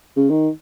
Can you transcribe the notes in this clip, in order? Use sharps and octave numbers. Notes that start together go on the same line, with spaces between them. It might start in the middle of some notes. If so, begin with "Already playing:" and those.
C#3
D#3